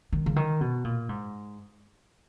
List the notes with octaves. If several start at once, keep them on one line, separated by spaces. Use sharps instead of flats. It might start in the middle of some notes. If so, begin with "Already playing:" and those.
D#3
C#3
D#3
B2
A#2
G#2